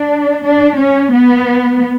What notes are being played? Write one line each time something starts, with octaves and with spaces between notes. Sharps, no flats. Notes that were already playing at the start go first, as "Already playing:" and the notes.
Already playing: D4
D4
C#4
B3